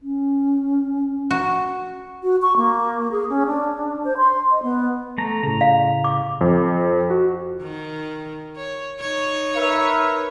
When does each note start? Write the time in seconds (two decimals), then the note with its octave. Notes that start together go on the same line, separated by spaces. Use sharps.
0.02 C#4
1.31 F#4
2.23 F#4
2.42 C#6
2.57 A#3
3.12 G#4
3.30 C#4
3.46 D4
4.04 C5
4.17 C6
4.51 D#5
4.63 B3
5.18 A3 A#5
5.43 A2 C#3 A#5
5.61 F5
6.04 D6
6.41 F2
7.10 F#4
7.62 D#3
8.57 C#5
8.99 D#4 C#5
9.56 A#4 B4 E5